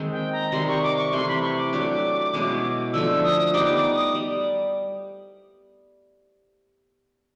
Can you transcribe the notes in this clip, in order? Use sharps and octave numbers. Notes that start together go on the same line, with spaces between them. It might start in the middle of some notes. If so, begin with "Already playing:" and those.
Already playing: D#3 G#3 A#3 C4 D#4
G5
A#5
C3 D#3 G3 C6
C#6
D6
C#6
C3 E3 A3 C6
B5
C#6
D6
F#3 A3 D4 G4
B2 G#3 C#4 E4
D3 F3 A3 E6
D#6
G3 B3 D#4 D6
D6
D#6
G3